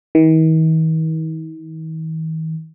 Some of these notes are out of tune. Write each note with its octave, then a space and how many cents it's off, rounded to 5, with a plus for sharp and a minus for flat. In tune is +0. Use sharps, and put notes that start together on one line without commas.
D#3 +45